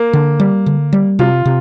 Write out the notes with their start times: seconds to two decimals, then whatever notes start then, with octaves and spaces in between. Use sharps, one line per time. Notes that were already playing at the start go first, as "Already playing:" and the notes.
Already playing: A#3
0.13 D3
0.40 G3
0.66 D3
0.93 G3
1.19 C3 F4
1.45 C3